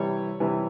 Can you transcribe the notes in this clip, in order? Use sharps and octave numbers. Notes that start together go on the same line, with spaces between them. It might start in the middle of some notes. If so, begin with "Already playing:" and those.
Already playing: C3 E3 G3 C#5
C3 E3 G3